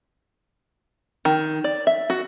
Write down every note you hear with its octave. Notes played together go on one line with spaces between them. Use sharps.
D#3
D5
E5
F#4